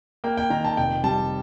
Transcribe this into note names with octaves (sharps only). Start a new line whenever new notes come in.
A#3 G5
G5
D#3 A#5
A5
F1 G5
G3 A5